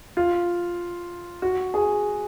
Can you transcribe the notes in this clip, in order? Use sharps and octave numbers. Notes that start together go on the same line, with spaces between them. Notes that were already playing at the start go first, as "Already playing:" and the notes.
F4
F#4
G#4